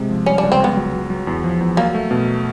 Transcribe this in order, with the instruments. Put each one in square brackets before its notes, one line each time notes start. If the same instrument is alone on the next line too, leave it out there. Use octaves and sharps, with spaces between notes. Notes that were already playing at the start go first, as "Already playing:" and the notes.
Already playing: [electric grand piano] C3 G#3
F3
[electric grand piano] G3 [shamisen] C#4
[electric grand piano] C#2 [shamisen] D4
[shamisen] C4
[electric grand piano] C#2 [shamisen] B3
[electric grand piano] F#3
F#3
F#3
E2
F3
E2
[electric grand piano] F#3 [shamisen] A#3
[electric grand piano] A3
B2